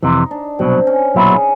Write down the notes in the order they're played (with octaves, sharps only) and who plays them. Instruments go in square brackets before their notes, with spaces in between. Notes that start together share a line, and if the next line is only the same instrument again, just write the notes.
[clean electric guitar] F2 C3 E3 [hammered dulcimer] D#4
[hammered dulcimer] D4
[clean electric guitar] C2 B2 F#3 [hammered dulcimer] C4
[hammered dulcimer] C#4
[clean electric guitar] B1 A#2 F#3 B3 E4 [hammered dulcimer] D#4
[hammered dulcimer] G#4